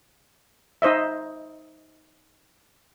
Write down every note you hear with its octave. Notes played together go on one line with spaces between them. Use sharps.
D#4 C5 D#5 E5